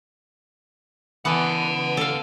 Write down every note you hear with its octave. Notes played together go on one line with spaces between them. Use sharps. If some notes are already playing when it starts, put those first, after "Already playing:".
E3 B3 F#5 A5
A4 F5